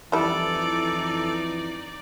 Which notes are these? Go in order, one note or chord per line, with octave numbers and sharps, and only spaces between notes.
F2 E3 G3 D#4 E4 A4 D5